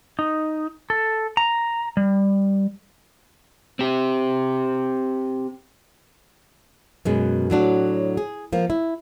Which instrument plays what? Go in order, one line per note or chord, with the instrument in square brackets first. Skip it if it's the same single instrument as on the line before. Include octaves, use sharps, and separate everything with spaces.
[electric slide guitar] D#4
A4
A#5
G3
C4 G4
[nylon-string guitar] F#2 B2 G#3
A2 F#3 D4 F#4
G#4
F3 A#3
E4